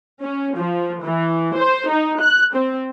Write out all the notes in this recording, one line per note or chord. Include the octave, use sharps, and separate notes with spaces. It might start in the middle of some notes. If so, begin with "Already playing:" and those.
C#4
F3
E3
C5
D#4
F#6
C4